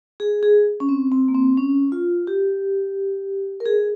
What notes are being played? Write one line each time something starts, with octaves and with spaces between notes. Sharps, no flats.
G#4
G#4
C#4
C4
C4
A#3
C4
C#4
F4
G4
A#4
G#4